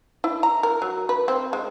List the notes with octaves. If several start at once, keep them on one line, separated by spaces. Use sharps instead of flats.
E4
A#5
A#4
F#3
B4
C4
G#3